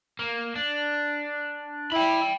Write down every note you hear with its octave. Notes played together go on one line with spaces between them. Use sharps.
A#3
D4
E4 G5 B5